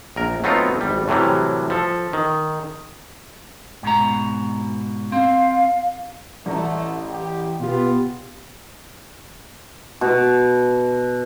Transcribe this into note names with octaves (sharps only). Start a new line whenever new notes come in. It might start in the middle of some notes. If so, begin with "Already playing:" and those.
A#1 A#4
F#3 A3 B3 C4 D#4 F4
G#1 G3
A2 C3 E3 F#3 G3
F3 A4
D#3
G#2 B2 A#5
C4 F5
A1 A3 D5 A#5
G4
B2 B3 F4 G4
B2